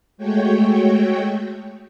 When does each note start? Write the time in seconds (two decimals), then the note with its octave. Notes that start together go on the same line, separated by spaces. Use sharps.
0.18 G#3 A3 F#4 C#5 G5